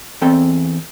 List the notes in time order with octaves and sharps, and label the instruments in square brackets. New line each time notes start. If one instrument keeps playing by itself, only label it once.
[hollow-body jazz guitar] E2 C4 A4 G5